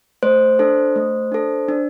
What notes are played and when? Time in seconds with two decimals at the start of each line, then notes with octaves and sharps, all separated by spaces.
0.23 A3 C5
0.59 D4 A4
0.96 A3
1.32 D4 A4
1.69 D4